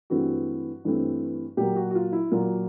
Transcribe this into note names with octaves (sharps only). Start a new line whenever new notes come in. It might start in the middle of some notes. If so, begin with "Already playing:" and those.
G2 E3 A3 C4 F#4
G2 E3 A3 C4
A#2 F#3 A#3 G4
F#4
F#4
F4
E4
A#2 F#3 A#3 F4